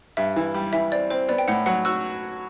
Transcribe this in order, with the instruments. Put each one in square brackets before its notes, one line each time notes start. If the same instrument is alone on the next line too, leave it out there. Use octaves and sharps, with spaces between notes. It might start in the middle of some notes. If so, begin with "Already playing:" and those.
[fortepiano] G2 [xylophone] E5
[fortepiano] E3
G3
[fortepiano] E3 [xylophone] E5
[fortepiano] C4 [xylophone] D5
[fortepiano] C4 [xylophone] C5
[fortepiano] B3 [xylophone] D5
[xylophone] G5
[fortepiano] A2 [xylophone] F#5
[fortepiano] F#3 [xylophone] F#5
[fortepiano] F#4 [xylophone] E6